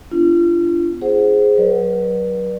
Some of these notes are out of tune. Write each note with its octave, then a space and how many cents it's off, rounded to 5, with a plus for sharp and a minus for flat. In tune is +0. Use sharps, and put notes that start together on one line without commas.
B3 +25 D4 -5 F4 -35
G#4 +5 C5 +0 F#5 +0
F#3 +10 B4 -40 D5 +20